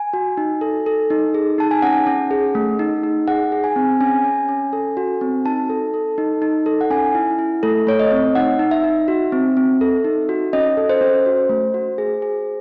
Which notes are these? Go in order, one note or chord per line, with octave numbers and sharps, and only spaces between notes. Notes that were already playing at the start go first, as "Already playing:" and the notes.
Already playing: G#5
F#4
D#4
A4
A4
D#4
G#4
D#4 A5
G#5
C#4 F#5
C#4
G#4
A3
D#4
D#4
G#4 F#5
G#4
G#5
C4
C#4 G#5
C#4
C#4
A4
F#4
C4
D#4 A5
A4
A4
D#4
D#4
A4
F#5
C#4 G#5
E4
E4
A3 A4
A3 C#5
D#5
C4
D#4 F#5
D#4
E5
D#4
F#4
C4
C4
A4
D#4
F#4
C#4 D#5
A4
C5
C#4
F#4
A3
F#4
G#4
G#4